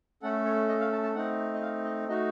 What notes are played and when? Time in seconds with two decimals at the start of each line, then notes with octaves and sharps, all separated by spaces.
0.22 A3 C#4 A4 F#5
0.45 C#5
0.69 D#5
0.80 F5
0.92 A5
1.03 A5
1.15 A3 C4 D#4 F#5
1.54 D#5
1.62 F5
1.85 D#5
2.08 A3 D#4 F#4 D#5